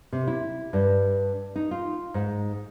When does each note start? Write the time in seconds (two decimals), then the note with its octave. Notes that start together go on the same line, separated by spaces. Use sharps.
0.12 C3
0.27 E4
0.73 G2
1.56 D#4
1.71 F4
2.14 G#2